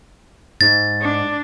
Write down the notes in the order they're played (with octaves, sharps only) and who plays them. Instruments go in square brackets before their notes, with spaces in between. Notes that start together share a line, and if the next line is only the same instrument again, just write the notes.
[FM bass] G#2 [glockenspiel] A6
[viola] D4